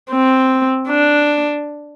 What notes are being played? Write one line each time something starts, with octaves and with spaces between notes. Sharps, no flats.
C4
D4